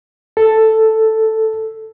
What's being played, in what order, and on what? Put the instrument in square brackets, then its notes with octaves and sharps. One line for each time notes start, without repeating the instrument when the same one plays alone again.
[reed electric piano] A4